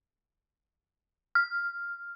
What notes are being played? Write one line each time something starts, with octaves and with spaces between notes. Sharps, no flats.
F6